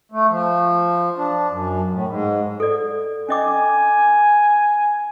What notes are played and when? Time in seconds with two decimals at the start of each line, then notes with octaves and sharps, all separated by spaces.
0.12 A3
0.29 F3
1.17 D4
1.49 F#2
1.90 A2
2.07 G#2
2.60 A4 D5
3.29 C#4 D#5 G#5 D6